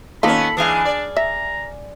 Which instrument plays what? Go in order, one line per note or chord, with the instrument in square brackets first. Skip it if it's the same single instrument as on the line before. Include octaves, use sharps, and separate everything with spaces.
[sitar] D#3 B3 C#4 [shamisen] A#3 D#4 F4 [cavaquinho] A4 [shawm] B5
[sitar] E3 G#3 [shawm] D4 [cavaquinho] F5 G#5 D#6
[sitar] D5
[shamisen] E5 [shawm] A#5